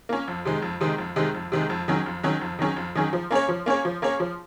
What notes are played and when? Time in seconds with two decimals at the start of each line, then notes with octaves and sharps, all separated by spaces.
0.09 A#3 C#4
0.28 F2
0.45 C3 D#3 G#3
0.62 F2
0.81 C3 D#3 G#3
0.98 F2
1.16 C3 D#3 G#3
1.34 F2
1.52 C3 D#3 G#3
1.70 F2
1.88 D#3 F#3 C#4 G#4
2.06 F2
2.23 D#3 F#3 C#4 G#4
2.41 F2
2.59 D#3 F#3 C#4 G#4
2.76 F2
2.95 D#3 F#3 C#4 G#4
3.13 F3
3.31 A#3 C#4 G#4 C#5
3.48 F3
3.66 A#3 C#4 G#4 C#5
3.85 F3
4.02 A#3 C#4 G#4 C#5
4.20 F3